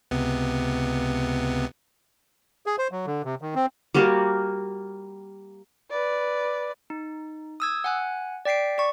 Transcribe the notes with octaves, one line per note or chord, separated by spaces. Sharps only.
C#2 C3 B3
G#4
C5
F#3
D3
C3
D#3
C4
G3 A#3 F#4 G4
B4 D5
D#4
D#6 E6 G#6
F#5 G#5 F#6
D5 G5 B6 C7 D7
D5 C#6